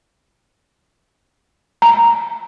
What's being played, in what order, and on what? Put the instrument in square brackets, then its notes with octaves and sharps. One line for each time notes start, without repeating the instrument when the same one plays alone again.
[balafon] A#5